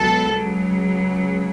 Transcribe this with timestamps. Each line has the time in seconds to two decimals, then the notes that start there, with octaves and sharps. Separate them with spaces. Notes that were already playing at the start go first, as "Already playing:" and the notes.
Already playing: C#2 B2 F#3 A4
0.29 C#2 C#3 F#3